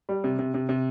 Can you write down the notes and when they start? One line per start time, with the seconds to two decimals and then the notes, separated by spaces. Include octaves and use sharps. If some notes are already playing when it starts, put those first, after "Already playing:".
0.09 G3
0.24 C3
0.39 C3
0.54 C3
0.69 C3